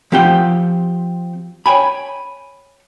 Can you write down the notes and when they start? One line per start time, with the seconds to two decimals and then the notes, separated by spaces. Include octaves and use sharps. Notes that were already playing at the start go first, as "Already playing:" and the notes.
0.12 F3 C4 G4 F#5 G5
1.66 C#5 G5 G#5 B5